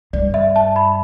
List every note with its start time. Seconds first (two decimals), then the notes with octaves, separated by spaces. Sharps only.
0.13 G2 D5
0.34 E5
0.56 A5
0.76 B5